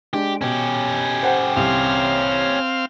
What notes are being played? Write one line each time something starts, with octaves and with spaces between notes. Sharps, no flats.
G#3 D4 G4
B2 C#4 G4
C5 F#5 G5
C2 C4 F5